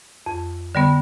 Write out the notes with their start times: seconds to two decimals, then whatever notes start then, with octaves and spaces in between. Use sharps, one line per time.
0.26 F2
0.75 D3 G3 B3